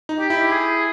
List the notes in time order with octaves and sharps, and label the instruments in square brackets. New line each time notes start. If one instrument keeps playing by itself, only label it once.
[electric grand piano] D#4
[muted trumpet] G4
[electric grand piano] E4
[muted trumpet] G#4